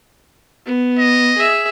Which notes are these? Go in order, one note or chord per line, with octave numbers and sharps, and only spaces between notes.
B3
D#5
G#4 E5